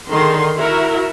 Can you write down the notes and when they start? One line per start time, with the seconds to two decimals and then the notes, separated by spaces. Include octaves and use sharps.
0.10 D3 D#3 G#4 C6
0.57 E4 F#4 A#4 E5